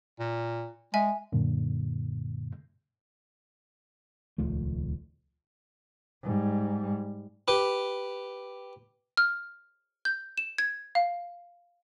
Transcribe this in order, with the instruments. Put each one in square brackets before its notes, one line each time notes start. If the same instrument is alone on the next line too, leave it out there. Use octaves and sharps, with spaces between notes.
[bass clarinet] A#2
[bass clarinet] G#3 [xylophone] E5 G#5
[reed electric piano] C#2 F#2 A#2 D3
[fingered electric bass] D#1 C#2 F3 A3
[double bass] G#2 G3
[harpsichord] G4 B4
[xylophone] F6
G6
E7
G#6
F5